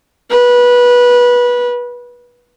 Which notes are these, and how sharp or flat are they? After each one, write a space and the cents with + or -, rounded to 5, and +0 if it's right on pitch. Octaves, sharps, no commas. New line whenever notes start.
B4 -20